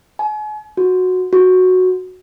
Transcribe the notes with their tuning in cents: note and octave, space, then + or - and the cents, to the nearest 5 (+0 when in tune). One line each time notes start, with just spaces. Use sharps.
G#5 +40
F#4 -10
F#4 -5